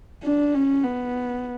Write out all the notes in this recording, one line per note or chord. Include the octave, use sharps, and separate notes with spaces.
D4
C#4
B3